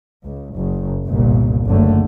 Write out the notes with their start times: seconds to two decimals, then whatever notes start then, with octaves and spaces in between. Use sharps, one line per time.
0.25 C#2
0.55 F#1
1.05 G1 C2 A#2
1.67 F#1 D3 A3